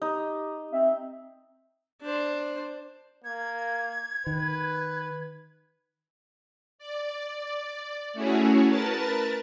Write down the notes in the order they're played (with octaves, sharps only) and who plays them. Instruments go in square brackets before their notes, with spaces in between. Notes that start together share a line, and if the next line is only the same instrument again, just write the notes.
[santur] D#4 [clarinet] G4
[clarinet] C4 [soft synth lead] E5
[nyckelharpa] D4 C5
[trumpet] A#3 [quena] G#6
[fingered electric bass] D#3 [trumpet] B4
[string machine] D5
A3 C#4 E4 F#4 G#4 C#5
A#4 B4 A5 A6